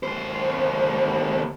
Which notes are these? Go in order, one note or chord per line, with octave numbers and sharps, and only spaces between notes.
D#2 C5